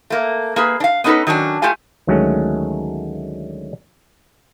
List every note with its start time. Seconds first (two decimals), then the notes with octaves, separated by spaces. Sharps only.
0.10 A3 A#3
0.56 A#3 G#4 B4
0.80 D4 F5
1.04 B3 C#4 D#4 G#4 A4 B4
1.27 D#3 F#3 C#4 D4
1.62 A3 F4 G4 A4 G#5
2.07 D2 D#3 F#3 G#3 A3 C#4